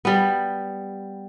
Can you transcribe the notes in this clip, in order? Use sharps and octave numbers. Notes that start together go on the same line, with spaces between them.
G3 B3